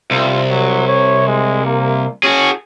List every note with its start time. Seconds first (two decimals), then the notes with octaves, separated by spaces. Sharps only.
0.11 C2 F4
0.50 F#3
0.87 C#5
1.28 G#3
1.65 A#3
2.23 C#4 F#4 G#4